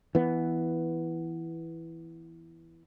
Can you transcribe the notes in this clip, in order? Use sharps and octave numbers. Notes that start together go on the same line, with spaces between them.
E3 B3